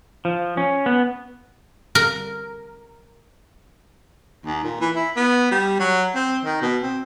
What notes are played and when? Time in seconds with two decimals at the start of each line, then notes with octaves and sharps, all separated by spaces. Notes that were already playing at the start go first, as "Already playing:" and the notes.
0.25 F3
0.57 C#4
0.86 B3
1.95 A#4
4.45 D#2
4.63 A#2
4.80 E3
4.96 E4
5.16 B3
5.51 G3
5.79 F#3
6.14 C4
6.44 D#3
6.61 B2
6.82 C4